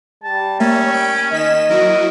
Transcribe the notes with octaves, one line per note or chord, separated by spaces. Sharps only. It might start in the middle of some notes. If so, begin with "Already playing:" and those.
G3 A5
A#3 C#4 C#5 E5
G5 D7
D#3 D#5 B6 E7
F#3 E4 F#4 A#4